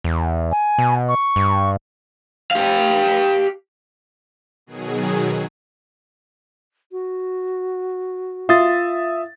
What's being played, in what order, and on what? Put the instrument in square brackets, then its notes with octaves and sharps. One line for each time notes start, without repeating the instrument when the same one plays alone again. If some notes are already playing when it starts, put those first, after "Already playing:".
[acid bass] E2
[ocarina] G#5
[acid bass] B2
[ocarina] C#6
[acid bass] G2
[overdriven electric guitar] G4 F5
[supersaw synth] B2 D#3 F#3 G#4
[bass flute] F#4
[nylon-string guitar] F4 [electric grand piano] E5 D#6 A6